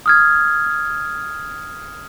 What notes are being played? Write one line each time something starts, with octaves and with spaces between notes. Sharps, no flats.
D#6 F6 G#6